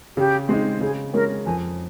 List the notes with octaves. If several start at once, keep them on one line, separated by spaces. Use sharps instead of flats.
C#3 G4
G#3 C4 D#4
C#3 G#4
G#3 C#4 A#4
F2 G#5